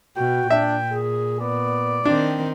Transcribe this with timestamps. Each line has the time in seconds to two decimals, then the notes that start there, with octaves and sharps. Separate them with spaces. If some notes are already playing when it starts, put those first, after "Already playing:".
0.17 B2 F#4 G5
0.50 A#2 D4 E5
0.92 G#4
1.41 B3 D5
2.05 D#3 C4 D4